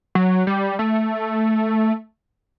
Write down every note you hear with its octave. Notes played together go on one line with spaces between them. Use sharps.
F#3
G3
A3